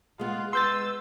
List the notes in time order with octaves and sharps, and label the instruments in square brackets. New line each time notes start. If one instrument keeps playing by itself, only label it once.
[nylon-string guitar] G#3 B3 [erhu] F4
[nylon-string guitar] G#3 [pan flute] B4 [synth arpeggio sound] C6 G6 A6 [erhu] E6